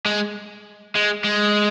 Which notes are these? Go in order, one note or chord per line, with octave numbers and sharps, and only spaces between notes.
G#3
G#3
G#3